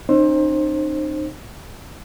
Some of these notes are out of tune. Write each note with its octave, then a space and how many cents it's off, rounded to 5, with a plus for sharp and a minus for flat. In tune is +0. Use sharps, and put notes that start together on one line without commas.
C4 +40 D#4 -30 C5 +25